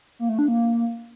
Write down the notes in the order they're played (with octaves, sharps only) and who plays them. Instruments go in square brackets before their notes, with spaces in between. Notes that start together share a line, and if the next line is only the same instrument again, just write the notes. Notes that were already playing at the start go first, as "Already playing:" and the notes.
[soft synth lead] A#3
A3
D4
A#3